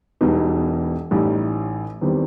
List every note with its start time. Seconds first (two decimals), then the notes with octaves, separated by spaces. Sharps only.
0.21 E1 E2 B2 G3 D#4
1.11 A1 A2 G3 D#4
2.01 E2 D#3 G3 C4